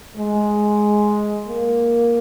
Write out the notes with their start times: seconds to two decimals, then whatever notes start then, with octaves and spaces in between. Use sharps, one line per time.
0.17 G#3
1.48 A#3